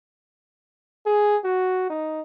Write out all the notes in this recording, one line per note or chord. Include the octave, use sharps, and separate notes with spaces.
G#4
F#4
D#4